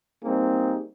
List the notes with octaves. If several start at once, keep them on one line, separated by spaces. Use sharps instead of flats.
G3 A#3 C4 D#4 G#4